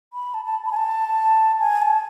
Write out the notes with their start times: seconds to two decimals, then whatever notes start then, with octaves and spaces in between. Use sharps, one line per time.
0.13 B5
0.34 A5
0.45 A5
0.66 B5
0.72 G#5
0.76 A5
1.60 G#5
1.82 A5